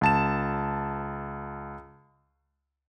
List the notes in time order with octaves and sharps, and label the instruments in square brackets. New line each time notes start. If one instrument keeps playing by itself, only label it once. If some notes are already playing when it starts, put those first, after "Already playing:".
[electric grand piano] C#2 A5 E7